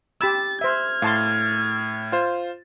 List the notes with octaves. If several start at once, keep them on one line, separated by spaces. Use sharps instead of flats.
G4 B5 E6 A6
C5 E5 F6 G#6
A2 F5 A5 C6 A6
F4 C5